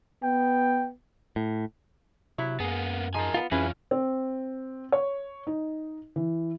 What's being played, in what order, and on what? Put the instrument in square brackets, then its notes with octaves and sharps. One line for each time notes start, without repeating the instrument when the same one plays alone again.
[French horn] B3 [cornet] G5
[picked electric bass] A2
[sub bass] C3 [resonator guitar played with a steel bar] F#3 E4
[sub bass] F#2 [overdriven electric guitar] A#3 B3 [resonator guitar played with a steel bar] G#4
[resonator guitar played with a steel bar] F3 D#4 G#4 [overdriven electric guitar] A#4 G#5
[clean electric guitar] B3 F4
[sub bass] F2 [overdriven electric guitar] E3 F4 [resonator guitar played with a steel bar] C#4 [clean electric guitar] E4 G#4 B4
[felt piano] C4
C#5
D#4
E3